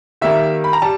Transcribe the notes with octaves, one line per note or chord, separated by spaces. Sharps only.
D#3 G3 A#3 E5
B5
A#5
G3 A5